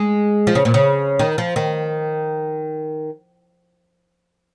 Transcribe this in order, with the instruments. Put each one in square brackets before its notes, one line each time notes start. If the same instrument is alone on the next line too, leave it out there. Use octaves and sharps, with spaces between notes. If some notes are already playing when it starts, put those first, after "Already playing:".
Already playing: [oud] G#3
F3
C#3
A#2
C#3
D#3
F3
D#3